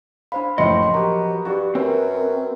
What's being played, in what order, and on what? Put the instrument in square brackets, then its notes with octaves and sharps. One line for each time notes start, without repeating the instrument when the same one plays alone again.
[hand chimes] D4 C5 B5 [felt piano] F5
[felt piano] F#1 A2 C#7 [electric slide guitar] F3 F#3 D#5 [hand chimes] C6
[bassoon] B3 [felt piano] G4 A#4 [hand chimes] A#5 C#6
[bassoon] G2 [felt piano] F#4 [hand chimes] G4
[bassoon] F#2 [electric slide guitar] C4 [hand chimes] A#4 B4 C#5